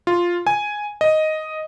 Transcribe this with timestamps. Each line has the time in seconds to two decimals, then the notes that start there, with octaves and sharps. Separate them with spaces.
0.07 F4
0.47 G#5
1.01 D#5